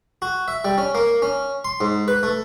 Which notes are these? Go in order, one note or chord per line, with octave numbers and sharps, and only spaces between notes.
F#4
E5
G3
C#4
A#3
C#4
C6
G#2
B4
A3